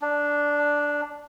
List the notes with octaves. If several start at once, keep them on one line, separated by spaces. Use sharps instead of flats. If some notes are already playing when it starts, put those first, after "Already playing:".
D4